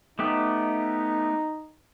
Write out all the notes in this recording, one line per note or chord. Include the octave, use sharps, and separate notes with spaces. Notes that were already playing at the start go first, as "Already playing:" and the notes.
A3 B3 D#4 G4